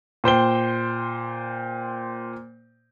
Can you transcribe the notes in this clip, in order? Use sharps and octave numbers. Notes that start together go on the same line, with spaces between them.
A#2 C5 G5 G7